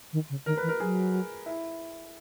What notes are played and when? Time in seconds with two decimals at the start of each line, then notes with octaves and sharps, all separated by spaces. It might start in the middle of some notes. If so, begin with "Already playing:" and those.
0.13 D#3
0.30 C#3
0.46 D#3 A#4
0.57 B4
0.63 E3
0.68 A#4
0.80 F#3 G#4
1.46 E4